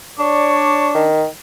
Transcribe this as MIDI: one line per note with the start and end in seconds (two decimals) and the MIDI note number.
0.19 1.08 62
0.19 0.97 73
0.19 0.97 74
0.19 0.97 85
0.95 1.26 51